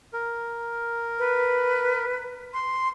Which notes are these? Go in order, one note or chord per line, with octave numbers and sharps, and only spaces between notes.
A#4
B4
C6